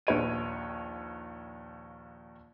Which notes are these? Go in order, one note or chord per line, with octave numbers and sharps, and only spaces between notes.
A#1 D#2 B4 C#5 D7 D#7